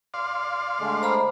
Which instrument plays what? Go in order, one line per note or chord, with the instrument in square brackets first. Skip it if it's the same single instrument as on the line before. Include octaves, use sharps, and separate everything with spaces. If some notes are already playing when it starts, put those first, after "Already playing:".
[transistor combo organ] D5 F5 C6
[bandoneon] D3 G#3 A3
[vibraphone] C5 A#5 B5